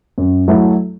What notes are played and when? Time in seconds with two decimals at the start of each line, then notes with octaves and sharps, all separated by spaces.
0.18 F#2
0.48 F#3 A3 E4 A4